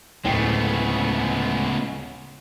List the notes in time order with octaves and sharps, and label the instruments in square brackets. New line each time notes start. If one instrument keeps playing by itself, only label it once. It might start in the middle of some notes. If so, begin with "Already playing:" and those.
[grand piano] D1 G5 C7 [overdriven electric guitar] C#3 G#3 [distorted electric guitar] A3 B3